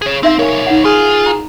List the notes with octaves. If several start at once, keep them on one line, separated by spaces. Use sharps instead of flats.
G#4 C#5
C4 D#4 E5 F5
B1 A#4 C#5 G#5
D#4 F#5
F4 G#4
A#5